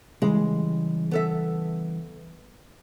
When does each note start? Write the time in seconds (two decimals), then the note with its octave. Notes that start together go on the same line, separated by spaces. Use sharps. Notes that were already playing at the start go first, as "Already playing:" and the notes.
0.22 C#3 E3 G3 G#3
1.11 B3 A4 E5